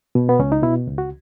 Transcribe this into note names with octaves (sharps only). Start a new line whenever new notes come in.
B2
B3
C#2 C#4
D#4
B2 E4
C#2
F#4